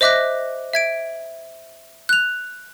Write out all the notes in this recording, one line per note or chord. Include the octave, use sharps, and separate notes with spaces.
C5 D#5 E5 D6 F#6 A#6
E5 G#6 D7
F#6 F7